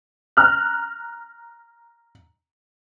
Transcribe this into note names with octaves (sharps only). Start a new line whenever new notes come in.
A#5 F6 F#6